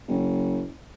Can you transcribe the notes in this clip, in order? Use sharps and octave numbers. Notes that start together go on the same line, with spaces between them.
F#1